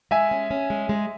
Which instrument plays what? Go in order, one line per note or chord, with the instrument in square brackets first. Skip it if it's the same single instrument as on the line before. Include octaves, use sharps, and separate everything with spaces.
[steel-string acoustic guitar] G#3 [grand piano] E5 G#5
[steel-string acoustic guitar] C#4
C#4
G#3
G#3